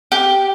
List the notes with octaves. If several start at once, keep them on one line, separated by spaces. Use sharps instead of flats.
G4